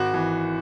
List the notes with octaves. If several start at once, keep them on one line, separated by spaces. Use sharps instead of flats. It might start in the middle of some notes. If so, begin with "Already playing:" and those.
Already playing: G#1 F#4
E3